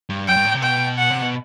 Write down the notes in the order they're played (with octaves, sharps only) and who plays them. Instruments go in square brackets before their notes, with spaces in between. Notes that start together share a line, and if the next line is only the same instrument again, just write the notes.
[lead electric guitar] G2
[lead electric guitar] F#2 [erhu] G5
[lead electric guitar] G2
A2
C3
[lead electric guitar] B2 [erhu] G5
[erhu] F#5
[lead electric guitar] C3
B2